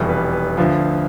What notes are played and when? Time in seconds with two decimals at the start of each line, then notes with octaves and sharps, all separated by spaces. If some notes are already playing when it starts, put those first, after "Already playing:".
Already playing: F1 E2 B2 G3
0.09 B4
0.33 B4
0.57 D2 D3 F3